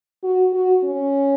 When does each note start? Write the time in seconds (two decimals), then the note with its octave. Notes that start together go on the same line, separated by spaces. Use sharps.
0.23 F#4
0.53 F#4
0.84 C#4